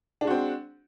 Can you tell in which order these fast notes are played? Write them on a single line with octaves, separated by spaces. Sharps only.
D4 G#3 F#4 C4